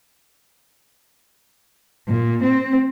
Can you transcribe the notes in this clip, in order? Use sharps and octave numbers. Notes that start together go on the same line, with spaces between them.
A#2
C4